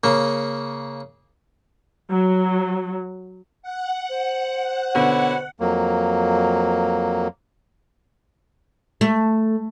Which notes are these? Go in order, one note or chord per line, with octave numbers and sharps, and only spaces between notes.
C#3 A#3
F#3
F#5
C5
B2 D3 B3 E4 F#4 C#5
F2 F#3 A#3
A3